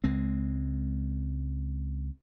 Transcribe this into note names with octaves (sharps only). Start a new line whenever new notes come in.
C#2 G#3 C4